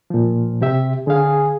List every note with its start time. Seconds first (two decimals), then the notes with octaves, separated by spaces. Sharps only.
0.10 A#2 F3
0.61 C3 G4 E5
1.07 D3 G#4 F5